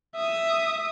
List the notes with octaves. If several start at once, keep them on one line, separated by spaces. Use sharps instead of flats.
E5 D#6